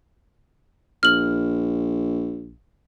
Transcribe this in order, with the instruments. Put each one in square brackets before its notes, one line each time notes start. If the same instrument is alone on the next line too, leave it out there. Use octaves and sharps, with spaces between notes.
[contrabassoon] A#1 [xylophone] F6 F#7